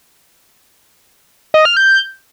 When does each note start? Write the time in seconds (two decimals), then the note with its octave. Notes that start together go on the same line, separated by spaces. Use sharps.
1.54 D#5
1.65 F6
1.77 G6